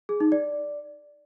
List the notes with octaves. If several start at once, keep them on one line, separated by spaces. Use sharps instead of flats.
G#4
D#4
D5